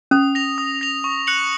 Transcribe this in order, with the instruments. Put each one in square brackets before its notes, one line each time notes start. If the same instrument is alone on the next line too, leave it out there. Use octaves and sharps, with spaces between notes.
[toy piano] C#4 [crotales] D#6
[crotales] A#6 F7
D#6
A#6 F7
C#6
F#6 C#7 F#7